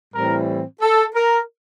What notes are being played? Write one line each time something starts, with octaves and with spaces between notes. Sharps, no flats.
A2 E3 G3 C4 A#4
A4
A#4